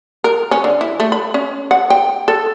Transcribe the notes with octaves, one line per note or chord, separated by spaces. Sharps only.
A#4
C#4
D3
E4
A3
B5
C#4
F#5
G5
A4